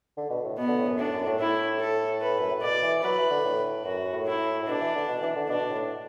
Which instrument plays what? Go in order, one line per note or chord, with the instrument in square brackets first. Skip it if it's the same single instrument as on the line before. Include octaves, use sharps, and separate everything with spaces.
[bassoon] D3
B2
A2
[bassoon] B2 [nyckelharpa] B3
[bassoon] D3
A2
F#2
[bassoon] A2 [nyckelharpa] D4
[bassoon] F#2
A2
[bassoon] A2 [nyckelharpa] E4
[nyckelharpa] A4
B4
[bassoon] F#2
A2
[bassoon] B2 [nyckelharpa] D5
[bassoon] E3
[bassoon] F#3 [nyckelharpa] B4
[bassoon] E3
D3
A2
[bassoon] F#2 [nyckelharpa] F#4
[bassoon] F#2
A2
[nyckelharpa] E4
[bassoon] A2
[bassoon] B2 [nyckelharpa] D4
[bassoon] E3
D3
B2
E3
D3
[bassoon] B2 [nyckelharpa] D4
[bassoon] A2